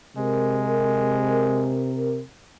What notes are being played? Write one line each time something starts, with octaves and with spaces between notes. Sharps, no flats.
C3 G#3 A#4